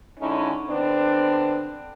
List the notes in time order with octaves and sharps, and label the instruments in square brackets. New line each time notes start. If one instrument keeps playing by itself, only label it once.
[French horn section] D3 G#3 C#4 D#4 E4
D3 B3 C4 D4